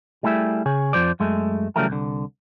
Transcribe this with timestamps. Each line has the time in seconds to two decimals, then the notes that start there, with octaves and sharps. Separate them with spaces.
0.23 G3 A3 E4 G#4 E5
0.66 C#3 G#4 C#5
0.93 F2 F3 C5 D5
1.20 F#2 G#3 A3
1.76 C#3 E3 F#3 G3 A3 A#4
1.89 C2 D3